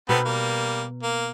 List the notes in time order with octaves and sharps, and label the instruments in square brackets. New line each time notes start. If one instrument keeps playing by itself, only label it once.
[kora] B2 D#4 B4 [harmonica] B3 C4 A4
[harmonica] G3 A#3
A#3